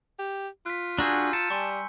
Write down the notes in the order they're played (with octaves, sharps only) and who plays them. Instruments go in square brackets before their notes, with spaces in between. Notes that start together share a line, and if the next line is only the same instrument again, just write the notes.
[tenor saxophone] G4
[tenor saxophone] F4 [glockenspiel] F#6 B6
[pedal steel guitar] D4 F#4 G#4 [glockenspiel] A#5 E6 G6
[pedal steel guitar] A5 [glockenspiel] C#7
[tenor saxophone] G3 [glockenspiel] G#5 C6 C#6